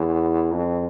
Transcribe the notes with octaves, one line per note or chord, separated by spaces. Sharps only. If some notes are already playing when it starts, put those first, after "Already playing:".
Already playing: E2
F2